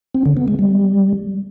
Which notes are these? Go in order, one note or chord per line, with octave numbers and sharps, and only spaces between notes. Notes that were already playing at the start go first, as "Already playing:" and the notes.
C4
D3
B3
G#3
G3